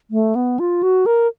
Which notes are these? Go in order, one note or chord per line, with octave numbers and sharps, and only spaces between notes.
A3
B3
F4
F#4
A#4